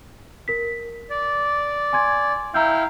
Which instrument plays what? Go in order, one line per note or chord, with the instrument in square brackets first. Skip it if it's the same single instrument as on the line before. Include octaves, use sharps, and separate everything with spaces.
[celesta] A#4 B6
[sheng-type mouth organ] D5
[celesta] G#5 C6 G#6
[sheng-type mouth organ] E4 F5 G5 [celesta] A#5 E6 G6